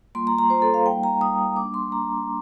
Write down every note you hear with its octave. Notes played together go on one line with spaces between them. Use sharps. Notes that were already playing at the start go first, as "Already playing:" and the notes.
G3 A#3 F4 C6
A#5
A#5
G3 A#3 F4 C5
A4
F5
G3 A#3 D#4 G5
A#5
G3 A#3 D#4 D#6
G3 A#3 D4 D6
C6
G3 A#3 D4 A#5